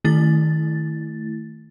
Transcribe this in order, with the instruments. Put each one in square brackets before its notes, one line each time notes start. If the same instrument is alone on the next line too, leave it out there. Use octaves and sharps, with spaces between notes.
[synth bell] D#3 A3 E4 A6